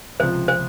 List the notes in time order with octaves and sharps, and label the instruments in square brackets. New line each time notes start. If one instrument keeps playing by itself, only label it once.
[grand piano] C#2 C3 F3 C4 F4 [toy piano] C5
[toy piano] C5